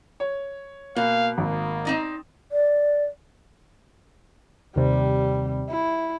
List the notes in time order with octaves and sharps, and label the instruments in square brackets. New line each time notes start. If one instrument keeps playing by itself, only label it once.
[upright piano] C#5
[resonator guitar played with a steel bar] B2 [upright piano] A#3 [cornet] F5
[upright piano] G#1 [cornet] A#3
[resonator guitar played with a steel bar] C4 D#4 D5
[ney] D5
[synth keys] D#2 C3 [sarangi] G3
[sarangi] E4